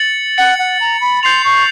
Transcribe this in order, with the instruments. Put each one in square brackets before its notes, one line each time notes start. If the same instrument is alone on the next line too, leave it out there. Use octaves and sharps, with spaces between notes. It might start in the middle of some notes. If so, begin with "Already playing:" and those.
Already playing: [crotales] A6 C#7 F#7
[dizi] F#5 [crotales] A6 C#7 F#7
[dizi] F#5
A#5
B5
[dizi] C6 [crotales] G6 C7 F7
[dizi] C#6